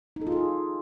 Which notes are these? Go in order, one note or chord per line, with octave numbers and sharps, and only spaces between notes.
D#4
A4
F4
G#4